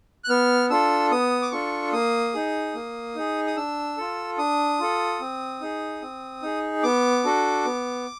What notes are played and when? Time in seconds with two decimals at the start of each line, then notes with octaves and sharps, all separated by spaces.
0.24 F#6
0.29 B3 F6
0.70 D4 F4 A4 E6
1.11 B3 D#6
1.42 D6
1.52 D4 F4 A4 C#6
1.93 A#3 D#6
2.34 D#4 G#4
2.75 A#3
3.15 D#4 G#4
3.47 D#6
3.57 D4 E6
3.97 F4 A4
4.38 D4 D#6
4.80 F4 A4
5.20 C4
5.61 D#4 G#4
6.02 C4
6.42 D#4 G#4
6.83 B3 D6
7.25 D4 F#4 A4
7.65 B3